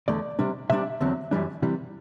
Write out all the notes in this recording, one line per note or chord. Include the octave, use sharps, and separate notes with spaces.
E2 D3 A3 D5
C3 G3 D4
C3 G3 D4 E5
E2 D3 F#3 C4
F#2 E3 G3 D4
C3 E3 G3